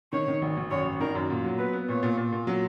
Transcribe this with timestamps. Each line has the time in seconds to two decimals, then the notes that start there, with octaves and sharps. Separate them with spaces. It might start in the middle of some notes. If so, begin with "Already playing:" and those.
0.12 D#3 C#5
0.28 D#3
0.42 G#1
0.57 G#1
0.71 F#2 C#5
0.85 G#1
1.00 D#3 A#4
1.15 F#2
1.30 A#2
1.44 F#3
1.58 B3 B4
1.73 B3
1.88 A#2 C#5
2.03 A#2
2.17 A#2
2.32 A#2
2.47 F#3